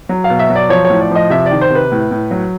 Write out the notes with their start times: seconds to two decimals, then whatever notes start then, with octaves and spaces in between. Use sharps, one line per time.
0.09 F#3
0.24 F5
0.30 B2
0.39 E5
0.50 F#3
0.55 D5
0.69 F3 C#5
0.85 C#5
0.90 A2
1.00 D5
1.11 F3 D#5
1.30 C3 E5
1.46 D5
1.51 D#3
1.61 C5
1.70 C3
1.75 B4
1.92 A2
2.11 A2
2.31 F#3